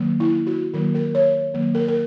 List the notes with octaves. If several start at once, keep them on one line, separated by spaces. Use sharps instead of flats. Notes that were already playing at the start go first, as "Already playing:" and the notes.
Already playing: D#3 F#3 A#3
E4
F#4
D#3 F#3 A#3 A#4
A#4
C#5
D#3 F#3 A#3
A#4
A#4